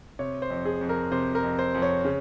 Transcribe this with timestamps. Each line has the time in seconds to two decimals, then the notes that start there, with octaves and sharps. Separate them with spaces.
0.19 C3 C#5
0.42 C5
0.50 F2
0.65 G#4
0.81 F2
0.89 A#4
1.12 C3 C5
1.35 A#4
1.43 F2
1.59 C5
1.74 F2
1.82 C#5
2.05 C#3